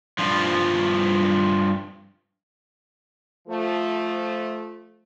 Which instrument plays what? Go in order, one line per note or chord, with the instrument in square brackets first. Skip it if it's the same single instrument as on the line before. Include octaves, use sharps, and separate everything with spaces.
[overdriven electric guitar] G2 F3
[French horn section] F3 A3